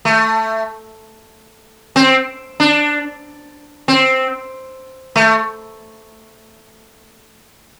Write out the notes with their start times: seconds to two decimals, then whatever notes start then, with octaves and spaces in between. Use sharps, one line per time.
0.05 A3
1.96 C4
2.60 D4
3.88 C4
5.16 A3